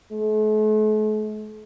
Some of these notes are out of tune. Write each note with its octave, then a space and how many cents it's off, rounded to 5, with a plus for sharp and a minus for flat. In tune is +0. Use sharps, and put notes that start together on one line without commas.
A3 -45